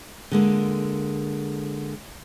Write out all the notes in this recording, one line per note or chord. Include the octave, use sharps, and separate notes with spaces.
D3 G#3 A#3